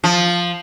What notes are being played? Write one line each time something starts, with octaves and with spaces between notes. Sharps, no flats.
F3